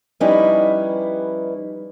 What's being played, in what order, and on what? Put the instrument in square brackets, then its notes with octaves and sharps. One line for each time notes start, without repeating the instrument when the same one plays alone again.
[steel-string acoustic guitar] F3 G3 C#4 D#4 E4 B4